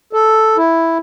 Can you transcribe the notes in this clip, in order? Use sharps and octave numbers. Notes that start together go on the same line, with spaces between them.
A4
E4